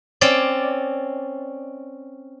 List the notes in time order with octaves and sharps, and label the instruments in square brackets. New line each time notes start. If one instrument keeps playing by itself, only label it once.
[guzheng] C4 C#4 D5